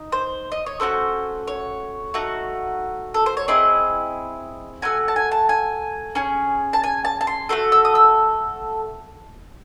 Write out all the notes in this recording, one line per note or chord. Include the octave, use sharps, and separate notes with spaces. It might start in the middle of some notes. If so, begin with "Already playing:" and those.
Already playing: D#4
C5
D#5
C#5
A3 C#4 F#4 C5
C#5
A3 D#4 F#4
A4
C5
C#5
C4 E4 G#4 D#5
A3 C#4 F#4 G#5
A5
G#5
A5
G#5
C#4 G#4
A5
G#5
A5
A5
C6
A3 C4 F#4 A4
E6
D#6
E6